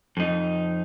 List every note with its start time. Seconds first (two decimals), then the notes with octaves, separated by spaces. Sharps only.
0.17 F2 D#4